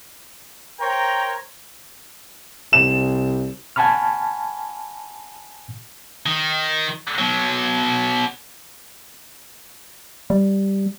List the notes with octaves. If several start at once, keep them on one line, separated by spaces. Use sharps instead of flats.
A#4 C5 C#5 G5 A#5
C2 E7
F#5 G#5 A5 B5 C#6 F6
D#3
B2 F#3
G3